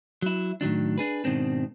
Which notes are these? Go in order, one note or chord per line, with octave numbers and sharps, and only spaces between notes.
F#3 E4
A2 D#3 F#3 D4
D4 G#4 B4
G#2 B2 D#3 C4 D4